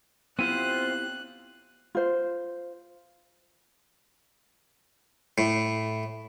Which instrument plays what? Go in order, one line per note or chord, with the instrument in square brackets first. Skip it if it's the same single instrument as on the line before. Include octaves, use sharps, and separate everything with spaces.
[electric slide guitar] B3 E4 G4 [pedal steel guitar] C4 F4 C5 [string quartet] F#6 [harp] D#7
[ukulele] F4 C5
[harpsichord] A2